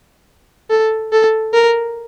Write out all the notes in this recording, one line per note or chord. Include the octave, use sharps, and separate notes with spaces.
A4
A4
A#4